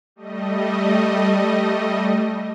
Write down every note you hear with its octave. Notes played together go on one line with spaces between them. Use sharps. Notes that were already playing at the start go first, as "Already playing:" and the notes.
G3 A3 D#5